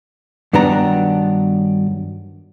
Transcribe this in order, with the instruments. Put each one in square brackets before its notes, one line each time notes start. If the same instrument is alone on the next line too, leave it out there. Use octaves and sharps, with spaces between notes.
[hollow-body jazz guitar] G2 D#3 F#3 B3 D4 A#5